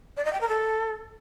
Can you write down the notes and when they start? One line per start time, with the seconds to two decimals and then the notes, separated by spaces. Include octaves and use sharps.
0.17 D5
0.25 D#5
0.33 G5
0.41 A#4
0.49 A4